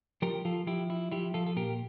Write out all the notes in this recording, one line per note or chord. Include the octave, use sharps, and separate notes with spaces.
F3 G4 A#4
F3 F4 A4
F3 E4 G4
E4
F3 E4 G4
F3 F4 A4
A4
A#2 G4 A#4